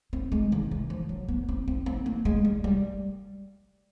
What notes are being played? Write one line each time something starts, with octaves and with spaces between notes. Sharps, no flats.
C4
G#3
D#3
E3
F3
F#3
B3
C4
C4
C4
A#3
G#3
G3
G3